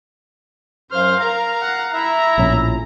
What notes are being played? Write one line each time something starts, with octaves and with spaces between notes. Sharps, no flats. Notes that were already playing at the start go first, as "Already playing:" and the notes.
F#2 C5 F5 F6
A#4 F5 A#5
F#5
E4 E5 A#5
A#1 A2 C#4